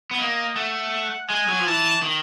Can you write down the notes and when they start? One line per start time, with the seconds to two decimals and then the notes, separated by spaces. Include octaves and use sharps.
0.11 B3
0.19 A#3 D#5
0.56 A3 F#5
1.29 G#3 G#5
1.49 F#3
1.59 F3
1.67 E3 A5
2.03 D#3